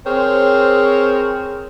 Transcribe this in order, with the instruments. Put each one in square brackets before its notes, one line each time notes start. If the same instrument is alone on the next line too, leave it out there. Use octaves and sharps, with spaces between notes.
[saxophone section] C4 G#4 A#4 C5 C#5